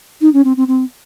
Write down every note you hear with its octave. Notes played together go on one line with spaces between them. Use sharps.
D#4
C#4
C4
C4
C4